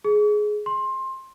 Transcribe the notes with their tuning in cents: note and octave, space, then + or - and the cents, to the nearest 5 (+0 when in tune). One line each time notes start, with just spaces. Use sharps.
G#4 +15
C6 +20